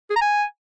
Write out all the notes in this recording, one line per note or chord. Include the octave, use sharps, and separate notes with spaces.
G#4
A#5
G#5